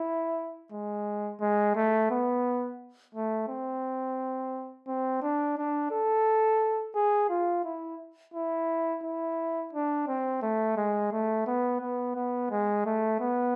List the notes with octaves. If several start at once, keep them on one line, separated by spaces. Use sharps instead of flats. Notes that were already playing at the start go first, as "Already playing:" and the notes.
Already playing: E4
G#3
G#3
A3
B3
A3
C4
C4
D4
D4
A4
G#4
F4
E4
E4
E4
D4
C4
A3
G#3
A3
B3
B3
B3
G#3
A3
B3